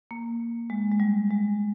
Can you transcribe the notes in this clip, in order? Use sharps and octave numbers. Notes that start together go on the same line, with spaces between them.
A#3
G#3
G#3
G3
G#3